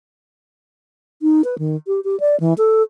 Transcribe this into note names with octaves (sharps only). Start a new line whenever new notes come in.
D#4
B4
D#3
G4
G4
D5
E3
A4